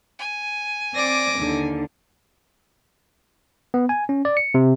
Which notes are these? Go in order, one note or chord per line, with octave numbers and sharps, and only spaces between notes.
G#5
C4 D5 D6 A#6
D#2 D3
B3
G#5
C#4
D5
C#7
C3